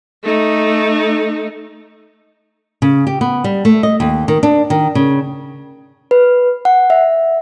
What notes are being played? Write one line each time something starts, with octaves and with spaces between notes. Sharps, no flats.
A3 D#4
C#3
G4
B3
G3
A3
D#5
D#2
D#3
D4
D#3
C#3
B4
F#5
E5